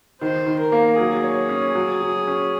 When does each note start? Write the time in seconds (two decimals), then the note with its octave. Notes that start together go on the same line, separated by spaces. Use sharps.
0.21 D#3 C5
0.46 D#3
0.59 A#4
0.72 A#3
0.98 F#3 G#4
1.24 C#5
1.49 C#4
1.75 F#3
2.02 F#3
2.28 C#4